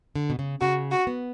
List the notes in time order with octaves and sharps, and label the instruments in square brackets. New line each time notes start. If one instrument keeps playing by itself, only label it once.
[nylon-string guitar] D3
B2
C#3
[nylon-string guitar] C#3 [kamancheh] F#4
[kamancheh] F#4
[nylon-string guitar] B3